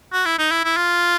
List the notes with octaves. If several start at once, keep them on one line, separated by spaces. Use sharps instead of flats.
F#4
E4
D#4
E4
E4
F4